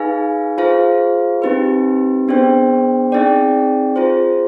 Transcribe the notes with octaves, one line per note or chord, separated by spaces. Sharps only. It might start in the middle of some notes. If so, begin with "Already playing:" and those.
Already playing: D#4 G#4 B4 F5 G#5
F4 G#4 C5 F5
C4 D#4 G4 B4
B3 D4 G#4 C5 G5
C4 D#4 G#4 D5 G5
F4 G#4 C5